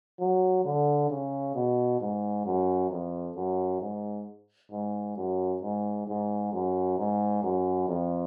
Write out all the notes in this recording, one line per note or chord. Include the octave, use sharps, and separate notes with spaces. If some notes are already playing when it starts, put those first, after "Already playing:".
F#3
D3
C#3
B2
G#2
F#2
F2
F#2
G#2
G#2
F#2
G#2
G#2
F#2
G#2
F#2
F2